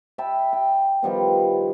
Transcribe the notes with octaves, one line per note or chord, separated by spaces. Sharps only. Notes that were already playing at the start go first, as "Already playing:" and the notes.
E5 G5 A5 B5
G5
D#3 F3 G3 B3